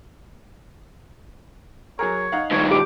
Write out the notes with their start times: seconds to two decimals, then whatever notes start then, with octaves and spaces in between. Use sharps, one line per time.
1.99 F#3 G#4 A#4 C#5
2.32 D#4 F5 F#5
2.52 G2 D#3 C#5
2.71 A#2 G4 D6